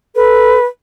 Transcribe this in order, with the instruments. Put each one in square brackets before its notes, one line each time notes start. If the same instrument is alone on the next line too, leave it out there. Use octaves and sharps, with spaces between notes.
[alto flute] A4 [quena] B4